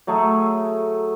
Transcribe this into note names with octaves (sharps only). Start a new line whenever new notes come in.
F#3 A3 G#4 A4